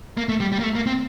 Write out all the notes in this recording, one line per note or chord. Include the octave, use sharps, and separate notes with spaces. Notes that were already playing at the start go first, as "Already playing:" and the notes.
A#3
A3
G3
G3
A#3
A3
A#3
C4